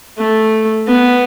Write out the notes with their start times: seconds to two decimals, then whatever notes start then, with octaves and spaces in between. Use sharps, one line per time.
0.18 A3
0.88 B3